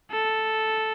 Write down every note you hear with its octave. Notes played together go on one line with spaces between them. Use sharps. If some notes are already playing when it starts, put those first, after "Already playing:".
A4